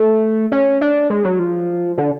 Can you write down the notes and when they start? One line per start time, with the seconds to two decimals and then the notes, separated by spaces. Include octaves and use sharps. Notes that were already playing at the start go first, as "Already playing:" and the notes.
Already playing: A3
0.52 C#4
0.81 D4
1.10 G#3
1.24 F#3
1.39 F3
1.98 D3